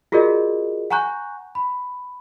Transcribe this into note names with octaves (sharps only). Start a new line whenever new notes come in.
F4 F#4 G#4 A#4 D5 D#5
F#5 G#5 A#5 C#6 F#6 G6
B5